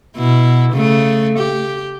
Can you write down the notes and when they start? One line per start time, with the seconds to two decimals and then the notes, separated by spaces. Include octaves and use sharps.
0.17 B2 E4
0.72 C#3 A3
1.38 G4